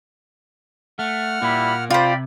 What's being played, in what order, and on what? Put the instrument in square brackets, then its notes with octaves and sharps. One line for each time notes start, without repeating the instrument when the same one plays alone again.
[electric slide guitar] A3 [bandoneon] F#5 F6
[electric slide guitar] A#2 A#3 [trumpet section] G3 E4 B5
[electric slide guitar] C3 [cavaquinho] F4 C5 [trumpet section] D5 G5 B5